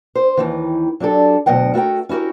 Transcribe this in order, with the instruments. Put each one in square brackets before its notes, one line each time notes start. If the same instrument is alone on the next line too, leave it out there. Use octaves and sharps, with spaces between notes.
[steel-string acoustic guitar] C5
D#2 D#3 E3
F#3 D4 G4 A4
D2 B2 F#3 D#5 F#5 G5
A3 F#4 A#4 G5
C#4 E4 F#4 G4 A#4